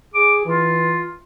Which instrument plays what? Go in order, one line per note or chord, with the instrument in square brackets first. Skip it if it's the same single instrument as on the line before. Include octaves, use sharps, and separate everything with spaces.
[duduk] G#4 [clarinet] D6
[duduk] E3 [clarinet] F4